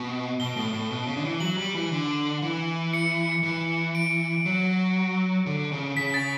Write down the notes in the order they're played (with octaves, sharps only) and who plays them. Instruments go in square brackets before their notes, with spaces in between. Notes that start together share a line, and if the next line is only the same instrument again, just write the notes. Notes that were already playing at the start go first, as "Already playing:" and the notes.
Already playing: [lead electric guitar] B2
[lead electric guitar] B2 [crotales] G7
[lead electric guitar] A2
A2
B2
C#3
D3
E3
[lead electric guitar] F#3 [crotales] F#7
[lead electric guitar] G3
E3
D3
E3
[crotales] C#7
[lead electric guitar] E3
[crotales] D7
[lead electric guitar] F#3
D3
C#3
[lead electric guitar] C#3 [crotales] B6
[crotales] A6